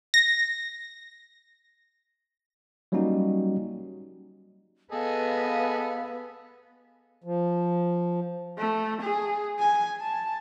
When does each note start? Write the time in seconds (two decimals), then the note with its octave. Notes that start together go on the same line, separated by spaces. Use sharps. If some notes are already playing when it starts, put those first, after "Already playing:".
0.14 A#6
2.92 F#3 G3 A#3 C#4 D#4 F#4
4.92 B3 G#4 A4 B4 D#5 F5
7.24 F3
8.58 A3
9.02 G#4
9.60 G#5
10.00 A5